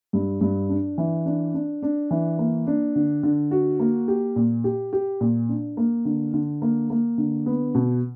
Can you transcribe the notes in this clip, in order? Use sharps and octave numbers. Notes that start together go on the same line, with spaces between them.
G2
G2
D4
E3
D4
D4
D4
E3
A#3
D4
D3
D3
F#4
A#3
G4
A#2
G4
G4
A#2
D4
A#3
D3
D3
A#3
A#3
D3
B3
B2